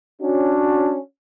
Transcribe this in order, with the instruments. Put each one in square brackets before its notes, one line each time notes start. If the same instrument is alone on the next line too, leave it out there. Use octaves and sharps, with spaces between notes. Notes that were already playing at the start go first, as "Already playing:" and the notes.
[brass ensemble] C#4 D4 F#4